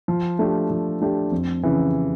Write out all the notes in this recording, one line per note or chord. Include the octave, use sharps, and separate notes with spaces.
F3
A3 D4 G4
F3
A3 D4 G4
F2
C#3 E3